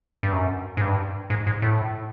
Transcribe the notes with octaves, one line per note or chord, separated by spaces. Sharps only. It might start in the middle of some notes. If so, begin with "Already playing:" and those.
G2
F#2
G#2
G2
G#2
G#2
A2